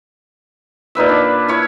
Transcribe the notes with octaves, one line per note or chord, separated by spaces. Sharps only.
A#2 D#4 B4 E5
D4
E4 C#5